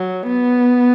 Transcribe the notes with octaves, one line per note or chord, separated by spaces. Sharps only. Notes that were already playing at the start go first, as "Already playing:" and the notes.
Already playing: F#3
B3